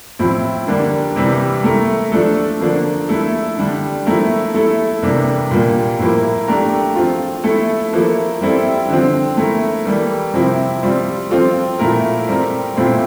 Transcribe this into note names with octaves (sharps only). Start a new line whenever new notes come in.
A2 F3 C4 E4
D3 G3 A#3 D4
C3 E3 G3
A3 E4 A#4
F3 A3 D4 A4
D3 F3 A#3 D4
A3 E4 A4
D3 G3 D4
F3 A3 E4 A#4
A3 E4 A4
C3 E3 G3 A#3 D4
A#2 G3 A#3
A2 F3 A#3 E4
A3 D4 G4 A#4
F3 C4 F4
A3 E4 A4
F3 A#3 E4 A4
G3 C4 E4 A4
D3 F3 C4
A3 E4 A#4
E3 G3 A#3
C3 F3 C4 E4
G3 C4 F4
F3 C4 F4 A4
A#2 A3 E4 A#4
G3 C4 G4 A#4
A#2 A3 C4 E4